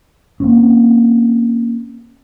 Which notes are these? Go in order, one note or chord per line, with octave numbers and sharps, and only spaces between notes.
A#3 C4 C#4